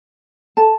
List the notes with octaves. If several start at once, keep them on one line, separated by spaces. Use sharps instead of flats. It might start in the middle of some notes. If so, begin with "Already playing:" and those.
A4 A5